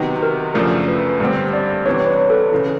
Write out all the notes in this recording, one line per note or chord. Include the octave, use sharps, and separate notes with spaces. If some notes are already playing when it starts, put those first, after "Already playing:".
Already playing: C3 D#3 F#3 B3 D#4
A#4
F#2 C#3 F3 A3 D4 A#4
B4
G2 D3 G3 C4
D5
C3 E3 G3 B3 D4 C#5
B4
A4
C#3 E3